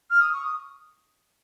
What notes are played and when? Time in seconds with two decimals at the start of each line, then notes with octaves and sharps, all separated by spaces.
0.10 F6
0.21 D#6
0.33 C#6
0.44 D#6